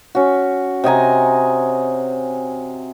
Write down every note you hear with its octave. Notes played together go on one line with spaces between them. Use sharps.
C#4 F#4
C3 D#5 G#5 A#5